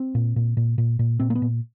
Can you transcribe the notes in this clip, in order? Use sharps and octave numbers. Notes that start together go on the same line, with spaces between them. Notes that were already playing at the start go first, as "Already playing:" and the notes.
Already playing: C4
A#2
A#2
A#2
A#2
A#2
A#2 C4
A#3
B3
A#2